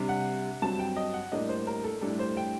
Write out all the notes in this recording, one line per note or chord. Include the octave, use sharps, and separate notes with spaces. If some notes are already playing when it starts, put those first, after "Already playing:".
Already playing: C3 G3 D4
F#5
G2 F#3 C4 A5
G5
D#5
F#5
A2 G3 A#3 D4 D#5
C5
A#4
A4
A2 G3 D4 A4
C5
G5